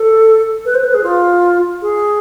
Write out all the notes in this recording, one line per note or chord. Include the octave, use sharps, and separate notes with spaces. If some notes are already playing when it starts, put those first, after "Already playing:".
Already playing: A4
B4
C5
B4
G#4
F4
G#4